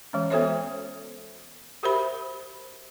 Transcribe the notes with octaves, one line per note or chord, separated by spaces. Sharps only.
E3 G#3 C#4
B3 F#4 A4 C5 C#5 E5
F#4 G4 A#4 C5 E5 B5